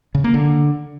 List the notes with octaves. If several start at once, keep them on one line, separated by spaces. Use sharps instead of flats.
C#3
A#3
D3